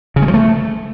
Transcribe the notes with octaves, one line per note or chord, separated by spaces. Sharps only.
C#3
G#3
F3
A3